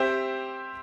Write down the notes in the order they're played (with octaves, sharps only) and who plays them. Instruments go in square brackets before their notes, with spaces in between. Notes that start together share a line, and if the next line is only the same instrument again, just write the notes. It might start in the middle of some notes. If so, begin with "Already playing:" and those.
Already playing: [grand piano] C4 G4 C5 E5